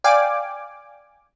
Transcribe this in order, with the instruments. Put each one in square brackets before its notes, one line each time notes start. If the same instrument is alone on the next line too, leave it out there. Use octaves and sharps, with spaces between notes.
[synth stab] D5 F5 G5 G#5 D6